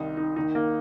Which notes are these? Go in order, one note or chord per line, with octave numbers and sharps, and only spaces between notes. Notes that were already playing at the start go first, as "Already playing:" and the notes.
Already playing: C2 C3 D#3 D#4
D#4
D#2 D#3 D#4
A#3